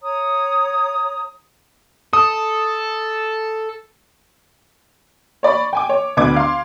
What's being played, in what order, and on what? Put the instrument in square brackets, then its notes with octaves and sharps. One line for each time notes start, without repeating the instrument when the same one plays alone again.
[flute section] C#5 A#5 D#6
[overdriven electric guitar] A4 [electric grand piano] D#6
[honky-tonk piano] C#5 D5 B5 C#6
G5 G#5 D6
C#5
D2 D3 B3 D4 D6 G#6
F5 C6